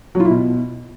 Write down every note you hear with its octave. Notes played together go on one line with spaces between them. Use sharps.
F#3
F4
E4
B2